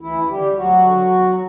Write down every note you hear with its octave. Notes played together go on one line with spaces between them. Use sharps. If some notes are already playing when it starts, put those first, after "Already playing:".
D2 E3 E4
D3 G3 G4
D2 F#3 F#4
D3
E2